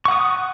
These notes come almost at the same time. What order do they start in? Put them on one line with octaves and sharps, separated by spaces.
C#6 F#5 D#6